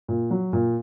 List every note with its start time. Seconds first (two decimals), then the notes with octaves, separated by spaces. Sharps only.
0.08 A#2
0.31 F#3
0.53 A#2